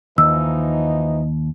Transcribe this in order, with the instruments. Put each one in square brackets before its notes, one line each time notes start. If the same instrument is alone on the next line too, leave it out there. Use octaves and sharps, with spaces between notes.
[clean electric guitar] D#2 [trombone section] E3 F3 D#4 [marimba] E6